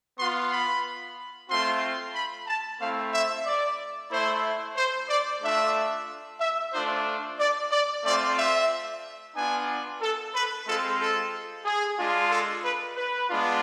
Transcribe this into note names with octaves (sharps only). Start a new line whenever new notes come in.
B3 F4 C6
B5
A3 C4 F4 C6
B5
A5
A3 C4 E4 F5
E5
D5
A3 E4 C5
C5
D5
A3 D4 F4 E5
E5
A3 D4 F4 C5
D5
D5
A3 C4 F4 D5
E5
B3 D4 F4 G#5
A4
B4
G#3 C4 F4 A4
A4
G#4
G#3 D4 F4
A4
B4
B4
G#3 B3 D4 F4